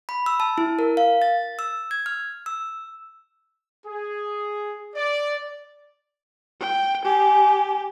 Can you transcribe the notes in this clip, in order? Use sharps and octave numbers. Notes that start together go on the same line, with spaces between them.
B5
E6
A5
E4
A#4
F5
A6
E6
G#6
F6
E6
G#4
D5
G5
G4 G#5